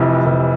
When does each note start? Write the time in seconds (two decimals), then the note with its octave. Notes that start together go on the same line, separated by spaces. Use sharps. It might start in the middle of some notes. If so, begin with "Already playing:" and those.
Already playing: F1 F2 C3 E3
0.26 F1